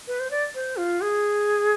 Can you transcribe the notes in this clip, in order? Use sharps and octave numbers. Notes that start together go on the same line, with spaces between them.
B4
C5
D5
C5
F4
G#4